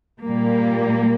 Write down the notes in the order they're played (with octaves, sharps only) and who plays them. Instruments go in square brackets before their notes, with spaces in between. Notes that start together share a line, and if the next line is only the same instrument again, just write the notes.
[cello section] A#2 G3 A#3